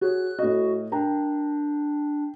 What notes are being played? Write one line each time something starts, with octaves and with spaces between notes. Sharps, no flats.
F#4 G#4 C#5 F#6
A2 F#4 D#5
D4 A#4 G5 A#5